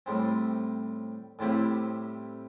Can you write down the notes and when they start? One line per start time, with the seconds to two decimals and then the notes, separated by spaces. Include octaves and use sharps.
0.06 A2 G3 C4
1.39 A2 G3 C4 E4 G4